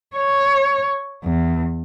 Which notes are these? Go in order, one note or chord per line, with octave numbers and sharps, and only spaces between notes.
C#5
E2